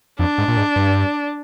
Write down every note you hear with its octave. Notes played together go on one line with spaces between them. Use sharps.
F2 D4
G#2
A#2
G#2
G2